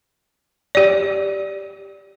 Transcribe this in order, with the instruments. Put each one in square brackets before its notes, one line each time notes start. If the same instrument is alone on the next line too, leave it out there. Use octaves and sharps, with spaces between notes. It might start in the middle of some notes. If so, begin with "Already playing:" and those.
[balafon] G4 D5